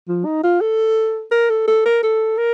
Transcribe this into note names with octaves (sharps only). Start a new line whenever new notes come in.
F3
D#4
F4
A4
A#4
A4
A4
A#4
A4
A#4